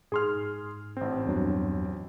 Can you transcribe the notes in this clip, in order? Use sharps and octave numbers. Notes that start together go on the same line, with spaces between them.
G#2 G#4 C6 F6
A1 C4
E2 G2 F#3